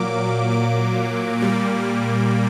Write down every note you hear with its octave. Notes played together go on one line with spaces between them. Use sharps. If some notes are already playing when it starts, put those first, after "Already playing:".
Already playing: A#2 F#3 A#3 D6
D6
A#2 G3 A#3 D6